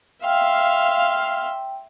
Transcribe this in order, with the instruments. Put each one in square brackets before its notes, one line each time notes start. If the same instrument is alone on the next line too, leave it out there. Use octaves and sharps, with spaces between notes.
[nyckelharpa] E5 C6 [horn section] F5 [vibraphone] G5